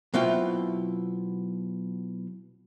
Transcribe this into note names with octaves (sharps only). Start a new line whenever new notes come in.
B2 F#3 C4 E4 F4 G5